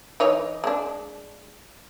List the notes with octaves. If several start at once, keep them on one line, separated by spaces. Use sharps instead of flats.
E3 D#4 C#5
G#3 D4